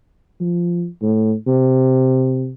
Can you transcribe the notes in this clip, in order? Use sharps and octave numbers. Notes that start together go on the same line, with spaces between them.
F3
A2
C3